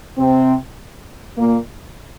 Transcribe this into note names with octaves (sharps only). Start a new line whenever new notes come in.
C3 C4
A#2 A#3